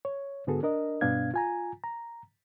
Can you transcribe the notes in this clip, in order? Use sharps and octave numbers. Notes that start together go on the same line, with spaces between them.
C#5
G#2 D3 B3 F#4 G#4 A4
D4 A#4 D#5
G2 B2 B3 D4 F5 G#6
F4 G#5 A#5
A#5